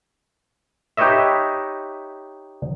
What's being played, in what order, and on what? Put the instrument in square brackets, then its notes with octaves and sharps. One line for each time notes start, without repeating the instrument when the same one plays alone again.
[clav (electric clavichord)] D#4 G4 B4 C#5 D#5 E5